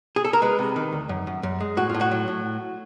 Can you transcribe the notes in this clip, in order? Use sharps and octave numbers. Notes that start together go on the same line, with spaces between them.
G#4
A4
A#4
G#3 B4
C3
D#3
D2
F#2
F#2
F#2
G#3
A2 F#4
A2 F4
F#4
F#3
A2